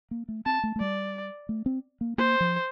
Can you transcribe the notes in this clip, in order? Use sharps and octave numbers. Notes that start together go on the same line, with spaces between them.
A#3
A3
C4 A5
A3
A3
G3 D5
A3
C4
A#3
A#3 C5
F3